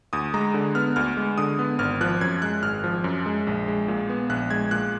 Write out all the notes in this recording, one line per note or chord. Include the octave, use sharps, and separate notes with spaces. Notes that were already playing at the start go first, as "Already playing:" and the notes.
D2 D#6
G#3 A#5
D3
B3 F6
D2 F6
G#3
D3 D#6
B3
G#1 F6
F3 F#6
F#2 G#6
G#3 F#6
G#1 F6
F3
F#2
G#3
A#1
G#3
A#2
B3
A#1 F#6
G#3 G#6
A#2 F#6